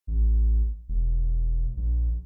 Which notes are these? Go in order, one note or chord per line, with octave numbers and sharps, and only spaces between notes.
A1
E1
A#1